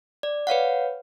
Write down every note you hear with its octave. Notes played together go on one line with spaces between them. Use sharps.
D5
B4 C#5 F5 F#5